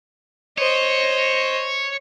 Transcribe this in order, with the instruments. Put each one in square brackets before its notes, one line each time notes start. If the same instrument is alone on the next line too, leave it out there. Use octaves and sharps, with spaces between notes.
[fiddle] C5 D#5 [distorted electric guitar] C#5